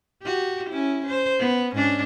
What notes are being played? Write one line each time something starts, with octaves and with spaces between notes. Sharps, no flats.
F#4 G4
C#4 E4
C5
B3
G#2 C#4 D4